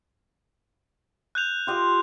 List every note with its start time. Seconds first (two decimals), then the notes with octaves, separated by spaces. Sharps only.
1.35 F#6 G6 F7
1.67 F4 G4 D#5